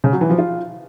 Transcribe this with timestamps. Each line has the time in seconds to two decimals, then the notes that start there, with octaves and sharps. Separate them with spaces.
0.04 C#3
0.12 F#3
0.21 E3
0.30 F3
0.38 F4